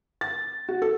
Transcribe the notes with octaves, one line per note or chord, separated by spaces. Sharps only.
A6
F#4
A4